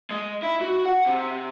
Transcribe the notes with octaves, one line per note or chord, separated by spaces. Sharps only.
G#3
E4
F#4
F#5
C3